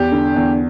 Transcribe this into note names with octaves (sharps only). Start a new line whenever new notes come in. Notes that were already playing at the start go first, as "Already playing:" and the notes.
Already playing: E2 G4
D3
E2